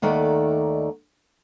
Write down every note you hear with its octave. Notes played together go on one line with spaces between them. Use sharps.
D#2 D#3 A3 D5 F#5